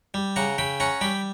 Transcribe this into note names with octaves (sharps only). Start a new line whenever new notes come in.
G3
C#3 F#5 A#5
C#3 G5 B5
C#4 F#5 A#5
G3 G5 B5